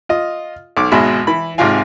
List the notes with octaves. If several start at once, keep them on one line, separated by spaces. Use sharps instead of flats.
F4 D#5
B1 D6
G#1 B2 G#3 E5 B5
E3 B5
G#1 G#2 C3 F4 F5 G#5